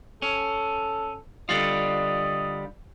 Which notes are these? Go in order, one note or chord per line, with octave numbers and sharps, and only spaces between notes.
C#4 A4
D3 G3 F4 D#5